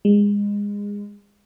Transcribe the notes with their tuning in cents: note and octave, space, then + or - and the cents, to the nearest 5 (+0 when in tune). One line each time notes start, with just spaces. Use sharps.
G#3 -25